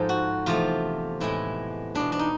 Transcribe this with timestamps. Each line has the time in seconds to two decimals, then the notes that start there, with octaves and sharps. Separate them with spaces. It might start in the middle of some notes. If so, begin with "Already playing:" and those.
Already playing: G#2 F3 G#3 A4
0.09 F#4
0.46 E2 C3 F3 A3 F4
1.20 A2 E3 G#3 E4
1.95 B2 G#3 D4
2.12 D4
2.19 D#4